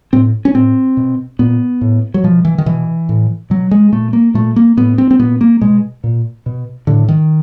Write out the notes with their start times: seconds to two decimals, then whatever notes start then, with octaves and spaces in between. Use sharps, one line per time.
0.13 A2 C4
0.45 C#4
0.55 A2 C4
0.97 B2
1.39 A#2 B3
1.81 A2
2.14 F#3
2.24 B2 F3
2.45 E3
2.58 D#3
2.66 B2 E3
3.09 A2
3.50 B2 F#3
3.71 G#3
3.92 A#2 A3
4.13 A#3
4.34 A#2 A3
4.56 A#3
4.77 A2 B3
4.98 C4
5.11 C4
5.19 A#2 B3
5.41 A#3
5.61 B2 G#3
6.04 A#2
6.46 B2
6.87 A2 D3
7.08 D#3